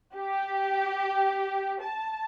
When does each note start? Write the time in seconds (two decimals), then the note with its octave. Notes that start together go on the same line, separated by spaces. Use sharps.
0.16 G4
1.82 A5